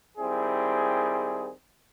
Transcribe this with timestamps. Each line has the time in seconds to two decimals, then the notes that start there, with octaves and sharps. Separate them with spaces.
0.18 D#3 G3 C4 E4 G#4